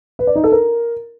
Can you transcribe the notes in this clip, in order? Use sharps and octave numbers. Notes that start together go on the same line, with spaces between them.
B4
D5
D#4
A4
A#4